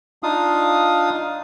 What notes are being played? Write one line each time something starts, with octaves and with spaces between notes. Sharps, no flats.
D4 D#4 F4 F5 D#6